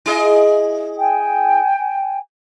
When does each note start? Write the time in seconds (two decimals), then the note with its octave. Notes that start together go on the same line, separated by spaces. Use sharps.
0.06 E4 G#4 D#5
0.98 G5 G#5